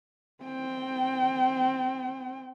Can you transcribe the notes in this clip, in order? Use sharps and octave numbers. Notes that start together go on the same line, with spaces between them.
C4 G5